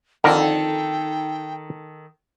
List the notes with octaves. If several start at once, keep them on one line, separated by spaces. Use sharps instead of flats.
F2 D3 D#3 A4 A#4 G5